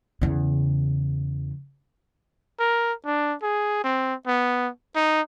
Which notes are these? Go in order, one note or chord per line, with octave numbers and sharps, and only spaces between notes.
E2 C#3
A#4
D4
G#4
C4
B3
D#4